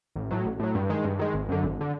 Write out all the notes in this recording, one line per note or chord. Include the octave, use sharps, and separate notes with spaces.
A1
A2 F#3
A1
A2 F#3
G2
D#3 G#3
G2
D#3 G#3
G#1
F#2 D3
G#1
D3